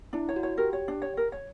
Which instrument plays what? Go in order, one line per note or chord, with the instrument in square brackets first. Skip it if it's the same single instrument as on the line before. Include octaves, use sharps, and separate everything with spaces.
[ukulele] D4 [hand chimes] E4
[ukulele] C#5
[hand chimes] F#4
[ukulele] C#5
[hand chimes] G4 [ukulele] A#4
[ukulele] C#5
D4
C#5
A#4
C#5